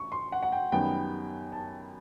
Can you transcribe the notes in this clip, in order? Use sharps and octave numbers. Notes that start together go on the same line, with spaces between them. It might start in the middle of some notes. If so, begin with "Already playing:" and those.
Already playing: A1 C#6
C6
F#5
F#5
G5
F#2 D#3 G3 B3 G5
A5